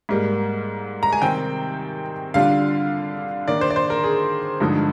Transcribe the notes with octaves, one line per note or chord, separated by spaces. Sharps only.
G#2 G3 A#3
A#5
G#5
C3 D#3 G3 C4 G5
D3 G3 D4 F4 F5
D#3 A#3 D4 D5
C5
D5
C5
A#4
G#4
G2 D3 F3 G#3 D#4